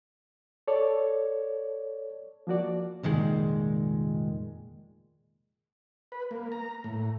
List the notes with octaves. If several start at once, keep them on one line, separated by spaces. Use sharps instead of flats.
A4 C#5 D5
F3 A#3 F#4 D5
F1 A#2 D#3 G#3
B4
A#3
A#5
A2